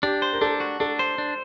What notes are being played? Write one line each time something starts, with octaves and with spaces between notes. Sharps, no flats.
D4 G4
C5
A#4
D4 A4
F#4
D4 A4
C5
D4